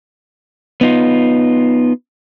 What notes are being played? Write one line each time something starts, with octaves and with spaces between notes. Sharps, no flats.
B3 D#4 F4